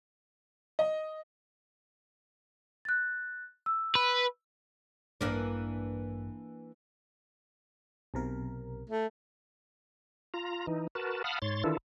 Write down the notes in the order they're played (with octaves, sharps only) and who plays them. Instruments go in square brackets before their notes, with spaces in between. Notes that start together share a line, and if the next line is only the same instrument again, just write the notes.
[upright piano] D#5
[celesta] F#6 A6
E6
[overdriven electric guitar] B4
[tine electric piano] A1 G2 [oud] E3 A#3 D4
[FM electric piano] B1 C3 A#4
[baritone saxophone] A3
[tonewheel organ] F4 A#5
E3 D#4
F#4 A#4 B4 A5
F5 F#5 A5 B5 D#6 F6
G#2 C#5 C6 A6
D#3 E3 D4 E4 F4 A4